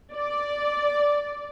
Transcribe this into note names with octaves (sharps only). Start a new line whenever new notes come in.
D5